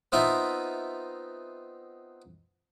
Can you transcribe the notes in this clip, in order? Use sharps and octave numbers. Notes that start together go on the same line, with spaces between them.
B3 C4 D#4 F4 D#5 E5